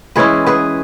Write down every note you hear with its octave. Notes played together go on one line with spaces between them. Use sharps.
E3 G#3 C#4 E4 G#4 B4
G#4 B4